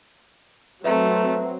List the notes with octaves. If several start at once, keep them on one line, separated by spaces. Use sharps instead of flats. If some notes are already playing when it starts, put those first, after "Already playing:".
F#3 A3 C4 F#4 B4 E5 A#5